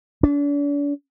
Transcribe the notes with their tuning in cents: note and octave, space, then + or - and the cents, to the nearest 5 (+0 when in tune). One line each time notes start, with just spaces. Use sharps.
D4 -40